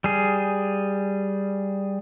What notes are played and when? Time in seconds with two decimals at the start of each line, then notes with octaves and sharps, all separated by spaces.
0.04 G3 G#4